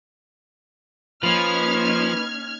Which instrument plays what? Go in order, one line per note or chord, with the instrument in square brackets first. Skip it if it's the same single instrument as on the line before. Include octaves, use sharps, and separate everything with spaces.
[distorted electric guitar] F3 [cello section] A#3 C#4 D#4 [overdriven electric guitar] B4 [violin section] F6 G#6